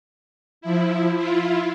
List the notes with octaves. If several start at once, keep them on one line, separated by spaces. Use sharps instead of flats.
F3 E4
E4 F4